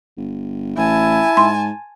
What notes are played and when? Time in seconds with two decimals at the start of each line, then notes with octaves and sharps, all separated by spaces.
0.17 G1
0.77 A1 E4 G#5 A5
1.37 G#2 C6